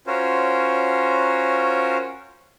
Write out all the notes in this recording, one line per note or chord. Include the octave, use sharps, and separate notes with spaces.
C#4 F4 F#4 A#4 C5 C#5